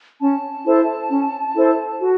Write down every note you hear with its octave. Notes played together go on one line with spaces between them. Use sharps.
C#4 A5
E4 A4 C5
C#4
E4 A4 C5
F#4